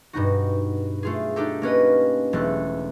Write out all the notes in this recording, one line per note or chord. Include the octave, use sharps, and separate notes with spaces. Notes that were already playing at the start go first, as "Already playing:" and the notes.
G2 B2 D#4 F#4
A3 F4 G#4
D4 D#4 G4 A4
A#3 C#4 B4 D#5
E1 A3 A4 F#6